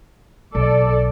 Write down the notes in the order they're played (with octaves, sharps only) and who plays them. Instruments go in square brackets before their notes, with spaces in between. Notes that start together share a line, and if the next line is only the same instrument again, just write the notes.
[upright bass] B1 [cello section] A4 D5